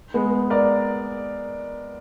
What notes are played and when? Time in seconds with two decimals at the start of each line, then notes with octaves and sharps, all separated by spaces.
0.14 G#3 B3
0.50 A#4 D5